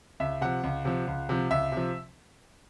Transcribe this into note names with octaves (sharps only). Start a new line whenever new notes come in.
C#2 E5
C3 F3 F#5
C#2
C3 F3
C#2
C3 F3
C#2 E5
C3
F3